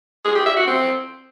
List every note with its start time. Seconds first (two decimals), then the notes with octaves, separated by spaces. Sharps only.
0.25 G#4
0.35 G4
0.46 E5
0.57 F#4
0.67 C4